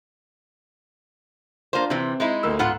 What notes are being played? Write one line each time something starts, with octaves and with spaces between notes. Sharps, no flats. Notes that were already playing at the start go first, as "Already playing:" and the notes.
A#3 D4 F4 C5
C3 E3 C4
G#3 D#4 E4
D2 A#3 E6
G#2 B3 F4 F#5